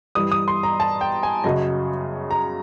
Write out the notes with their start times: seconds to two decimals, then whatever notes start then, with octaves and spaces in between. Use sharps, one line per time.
0.15 G2 E3 G3 D#6
0.32 D#6
0.48 C6
0.63 A#5
0.80 A5
1.01 G5
1.23 G#5
1.44 F#2 C#3 F#3 D#5
2.31 A#5